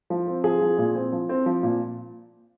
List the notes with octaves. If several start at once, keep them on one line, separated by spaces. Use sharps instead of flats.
F3
C4
F3 G#4
F3
A#2
C4
F3
C4
F3
A#2